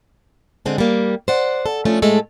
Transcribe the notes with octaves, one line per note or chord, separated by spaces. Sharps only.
D3 G#3 C4 G#4
G3 A#3
C5 D5 F#5
A4
F3 A3 C#4 D4
A2 G#3 A3 A4